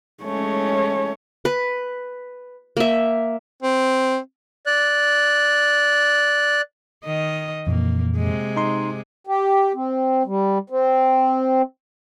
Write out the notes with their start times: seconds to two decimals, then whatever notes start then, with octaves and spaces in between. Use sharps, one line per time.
0.23 G#3 A3 C#4 C#5
1.45 B4
2.77 A#3 E5
3.62 C4
4.66 D5 F#6
7.05 D#3 D#5
7.67 F2 A#2 E3 A#3
8.17 C3 G#3
8.56 D#4 C6
9.27 G4
9.74 C4
10.26 G3
10.70 C4